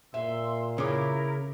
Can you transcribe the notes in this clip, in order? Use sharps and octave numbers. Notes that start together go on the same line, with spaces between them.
A#2 E5 C6 E6
C#3 E4 A#4 C#5 D6